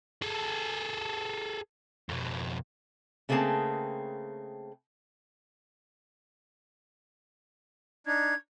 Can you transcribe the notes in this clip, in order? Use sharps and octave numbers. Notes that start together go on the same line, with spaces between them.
G#4 A4
F2 B2
C#3 A3 A#3 C4 G#4 A5
D4 D#4 G#6